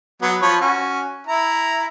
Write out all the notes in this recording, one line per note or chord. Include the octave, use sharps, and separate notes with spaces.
F#3 B3
F3 B4 C#5
C#4 F#4
E4 A#5